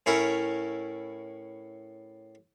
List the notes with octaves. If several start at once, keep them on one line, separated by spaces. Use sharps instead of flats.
A2 C#4 E4 A#4 A#5